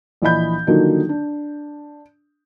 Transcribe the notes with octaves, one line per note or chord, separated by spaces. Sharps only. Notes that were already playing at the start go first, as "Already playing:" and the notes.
A#1 E3 D#5 B5 G6
D3 D#3 F3 F#3 A#3 D#4
D4